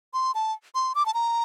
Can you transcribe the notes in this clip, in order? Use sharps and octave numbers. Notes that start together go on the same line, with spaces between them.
C6
A5
C6
D6
A5
A#5